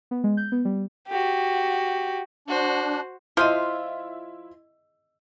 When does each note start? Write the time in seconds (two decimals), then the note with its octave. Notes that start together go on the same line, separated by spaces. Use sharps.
0.11 B3
0.24 G#3
0.37 G6
0.52 B3
0.65 G3
1.08 F#4 G4
2.48 D4 F#4 C5
3.37 F3 E4 F4 D#5 E5 C6 F6